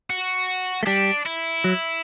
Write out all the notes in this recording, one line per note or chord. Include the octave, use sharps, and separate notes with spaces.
F#4
A3
G3 D4
E4
F#3